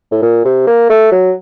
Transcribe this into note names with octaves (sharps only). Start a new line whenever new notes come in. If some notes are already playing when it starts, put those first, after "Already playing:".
A2
A#2
C3
A#3
A3
F#3